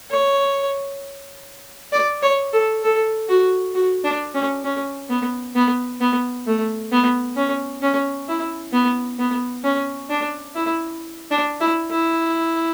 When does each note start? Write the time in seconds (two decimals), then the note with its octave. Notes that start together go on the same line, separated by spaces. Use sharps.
0.11 C#5
1.93 D5
2.23 C#5
2.53 A4
2.84 A4
3.29 F#4
3.75 F#4
4.04 D4
4.35 C#4
4.65 C#4
5.10 B3
5.56 B3
6.01 B3
6.47 A3
6.92 B3
7.37 C#4
7.82 C#4
8.28 E4
8.73 B3
9.19 B3
9.64 C#4
10.10 D4
10.55 E4
11.31 D4
11.61 E4
11.91 E4